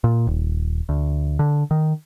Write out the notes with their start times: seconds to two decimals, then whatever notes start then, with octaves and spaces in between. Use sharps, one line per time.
0.04 A#2
0.27 D#1
0.89 D2
1.39 D3
1.71 D#3